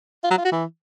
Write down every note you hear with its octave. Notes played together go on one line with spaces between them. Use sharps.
F4
F#3
F4
F#4
E3